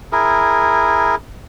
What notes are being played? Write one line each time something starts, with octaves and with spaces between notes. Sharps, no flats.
E4 G#4 A#4